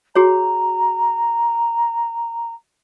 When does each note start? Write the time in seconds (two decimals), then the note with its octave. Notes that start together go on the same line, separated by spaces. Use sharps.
0.16 F#4 G#4 C#5 A#5